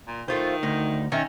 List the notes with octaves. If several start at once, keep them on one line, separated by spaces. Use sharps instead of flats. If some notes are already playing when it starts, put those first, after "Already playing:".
A#2
D#3 A3 F4 C5
D2 D#4
D#3 C#4 D#5 E5